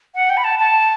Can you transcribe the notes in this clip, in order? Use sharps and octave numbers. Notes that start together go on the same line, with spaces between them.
F#5
G5
B5
A5
A5